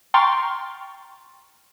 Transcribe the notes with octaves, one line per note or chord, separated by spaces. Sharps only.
G5 A#5 C6 C#6 F6 A6